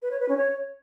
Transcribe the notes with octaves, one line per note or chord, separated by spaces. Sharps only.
B4
C#5
B4
C#4
C#5